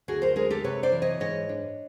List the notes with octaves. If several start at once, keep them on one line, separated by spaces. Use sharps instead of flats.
D2 F#4 G#4
A#4 C5
G#3 G#4 A#4
G4 A4
C3 B4 C#5
C5 D5
E3
C#5 D#5
G#2 C#5 D#5
D4